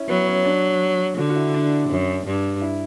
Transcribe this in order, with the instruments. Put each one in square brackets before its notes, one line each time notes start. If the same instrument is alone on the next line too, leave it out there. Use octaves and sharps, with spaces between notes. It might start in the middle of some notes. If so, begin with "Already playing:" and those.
Already playing: [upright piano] C#4 E4
[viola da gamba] F#3 [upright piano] B3
[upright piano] C#4
D4
[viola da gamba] D3 [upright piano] F#4
[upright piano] F#4
E4
D4
[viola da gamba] F#2
G2
[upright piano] E4